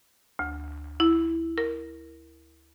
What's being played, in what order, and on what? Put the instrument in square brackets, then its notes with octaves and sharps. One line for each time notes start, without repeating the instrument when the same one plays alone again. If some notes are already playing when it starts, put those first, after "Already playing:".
[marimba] D2
E4
A#4